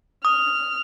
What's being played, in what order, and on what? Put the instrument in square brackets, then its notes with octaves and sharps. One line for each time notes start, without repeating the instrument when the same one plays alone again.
[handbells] D#6 [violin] F6